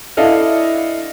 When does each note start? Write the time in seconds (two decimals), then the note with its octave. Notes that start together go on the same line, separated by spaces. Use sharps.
0.17 D4 E4 A4 D#5 F5